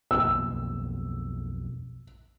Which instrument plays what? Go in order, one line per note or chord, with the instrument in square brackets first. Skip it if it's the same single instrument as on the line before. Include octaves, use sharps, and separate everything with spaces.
[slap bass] B1 F2 A#3 [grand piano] E6